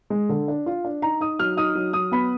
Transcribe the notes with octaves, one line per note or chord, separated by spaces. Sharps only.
G#3
D3
D4
F4
D4
D#4 A#5
D#4 D#6
F#3 F6
D#4 D#6
F#3
F#3 D#6
B3 B5